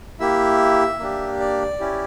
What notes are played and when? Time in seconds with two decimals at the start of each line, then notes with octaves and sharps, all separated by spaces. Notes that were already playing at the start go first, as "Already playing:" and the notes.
0.20 A#3 E4 G4 E5
0.99 A#3 D4 G4
1.39 D5
1.80 C#4 E4 G4